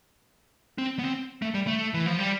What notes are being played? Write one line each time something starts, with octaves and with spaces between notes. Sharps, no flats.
C4
B3
C4
A3
G3
A3
E3
F3
G3